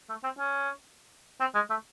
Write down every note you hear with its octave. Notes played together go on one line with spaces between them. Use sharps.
A3
C4
C#4
C4
G#3
A3